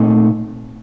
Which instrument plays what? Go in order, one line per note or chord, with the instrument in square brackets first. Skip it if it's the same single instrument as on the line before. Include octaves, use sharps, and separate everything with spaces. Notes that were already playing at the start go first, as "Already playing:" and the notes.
Already playing: [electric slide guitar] A#2 A3 C4 D#4